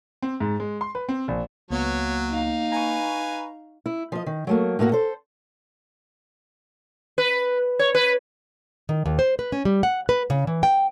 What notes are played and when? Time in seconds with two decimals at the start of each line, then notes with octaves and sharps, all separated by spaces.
0.22 C4
0.40 G#2
0.60 G#3
0.81 C6
0.95 B4
1.09 C4
1.28 A#1
1.71 C#2 F#3 A#3 B3 C#5
2.30 D#4 F5
2.72 B4 G#5 A#5 C#6
3.86 E4
4.12 F3 D#5
4.26 D#3
4.47 F#3 A3 A#3
4.79 A2 A3 A#3 F#4
4.92 A4 C5
7.18 B4
7.79 C#5
7.95 B4
8.89 D#3
9.06 D#2
9.19 C5
9.39 B4
9.52 C#4
9.65 G3
9.83 F#5
10.09 B4
10.30 C#3
10.47 E3
10.63 G5